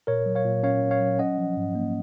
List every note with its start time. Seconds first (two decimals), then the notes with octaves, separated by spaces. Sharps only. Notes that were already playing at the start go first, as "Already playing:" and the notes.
0.07 A#2 A#4 C#5
0.26 F#3
0.35 C#5 F5
0.45 A#2
0.63 C#4 C#5 F5
0.82 A#2
0.91 C#5 F5
1.01 F#3
1.19 C#4 D#5 F#5
1.38 F3
1.57 G#2
1.75 A#3